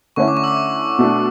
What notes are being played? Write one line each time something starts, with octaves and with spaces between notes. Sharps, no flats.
D3 A3 C#4 E4 C#6
D6
C#6
E6
D6
B2 A3 D4